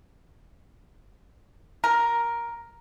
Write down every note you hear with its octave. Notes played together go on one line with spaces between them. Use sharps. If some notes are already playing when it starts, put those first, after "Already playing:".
A#4